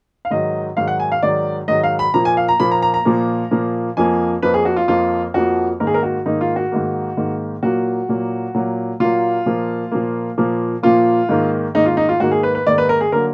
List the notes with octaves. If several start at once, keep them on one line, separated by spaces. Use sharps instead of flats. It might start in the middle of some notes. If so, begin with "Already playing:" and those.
F5
G#2 D#3 F#3 D#5
G#2 D#3 F#3 F5
F#5
G#5
F5
G#2 D#3 F#3 D5
G#2 D#3 F#3 D#5
F5
B5
A#2 F3 A#3 A#5
G#5
F5
A#5
A#2 F3 A#3 B5
A#5
A#5
A#5
A#2 F3 A#3
A#2 F3 A#3
F2 F3 A#3 G#5
F2 F3 A#3 B4
G#4
F#4
F4
F2 F3 A#3 F4
F2 F3 A#3 F#4
G#2 D#3 A#3 A#4
G#4
A#4
F#4
G#2 D#3 A#3 D#4
F4
F#4
G#2 D#3 A#3
G#2 D#3 A#3
A#2 F#3 A#3 F#4
A#2 F#3 A#3
A#2 F#3 A#3
A#2 F#3 A#3 F4
A#2 F3 A#3
A#2 F3 A#3
A#2 F3 A#3
A#2 F3 A#3 F4
G#2 D#3 A#3
G#2 D#3 A#3 D#4
F4
D#4
F4
G#2 D#3 A#3 F#4
G#4
B4
B4
G#2 D#3 A#3 D5
B4
A#4
G#4
D3 F#3 A#3 A#4